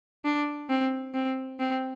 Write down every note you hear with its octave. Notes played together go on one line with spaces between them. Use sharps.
D4
C4
C4
C4